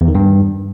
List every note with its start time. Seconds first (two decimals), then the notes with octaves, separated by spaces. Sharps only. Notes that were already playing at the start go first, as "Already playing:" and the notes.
0.01 E2
0.08 D#3
0.15 G2